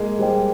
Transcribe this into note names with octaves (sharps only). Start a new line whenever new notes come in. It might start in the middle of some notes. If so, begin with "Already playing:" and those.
Already playing: G#3 A#3
G3 G#4 C5 D#5 G5